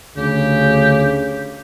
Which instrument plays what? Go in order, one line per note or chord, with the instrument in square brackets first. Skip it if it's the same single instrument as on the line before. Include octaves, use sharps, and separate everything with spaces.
[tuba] D2 [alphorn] C#3 [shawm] G4